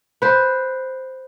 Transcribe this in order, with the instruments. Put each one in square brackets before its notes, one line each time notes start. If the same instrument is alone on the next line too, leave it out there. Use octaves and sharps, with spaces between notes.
[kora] B4 C5